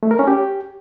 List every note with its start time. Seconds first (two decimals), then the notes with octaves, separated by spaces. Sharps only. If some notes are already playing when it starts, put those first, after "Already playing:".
0.03 A3
0.11 A#4
0.19 C#4
0.27 G4